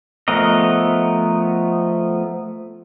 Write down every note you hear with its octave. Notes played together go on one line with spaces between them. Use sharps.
F3 A3 B3 A#4 D#5